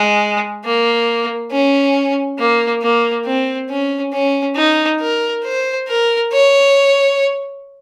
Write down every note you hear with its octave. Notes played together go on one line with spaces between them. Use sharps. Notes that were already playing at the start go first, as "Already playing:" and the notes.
Already playing: G#3
A#3
C#4
A#3
A#3
C4
C#4
C#4
D#4
A#4
C5
A#4
C#5